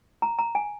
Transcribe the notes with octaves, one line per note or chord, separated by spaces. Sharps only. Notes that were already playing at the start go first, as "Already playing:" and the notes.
A#5
A#5
G#5